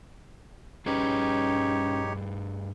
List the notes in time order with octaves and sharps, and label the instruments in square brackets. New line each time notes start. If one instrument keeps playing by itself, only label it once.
[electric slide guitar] G2 G#4 B4 [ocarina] C#4 [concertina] D#4 G4 C#5